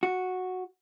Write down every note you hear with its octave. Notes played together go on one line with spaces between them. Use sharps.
F#4